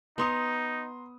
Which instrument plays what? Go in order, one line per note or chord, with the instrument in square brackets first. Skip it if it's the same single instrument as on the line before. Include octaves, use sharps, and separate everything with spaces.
[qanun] B3 C#5 F#5 [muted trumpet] D#4 [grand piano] A#5 C6 D#6